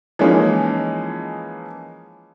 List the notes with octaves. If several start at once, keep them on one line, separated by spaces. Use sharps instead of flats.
E3 F3 G#3 A#3 C#4 D#4